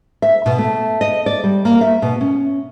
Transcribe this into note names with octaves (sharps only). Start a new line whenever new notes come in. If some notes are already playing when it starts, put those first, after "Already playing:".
E5
B2
A3
D#5
D5
G3
A#3
E5
B2
C#4